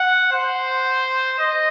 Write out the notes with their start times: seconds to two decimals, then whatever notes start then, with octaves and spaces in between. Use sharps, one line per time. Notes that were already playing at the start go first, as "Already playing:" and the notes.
Already playing: F#5
0.32 C5
1.39 D#5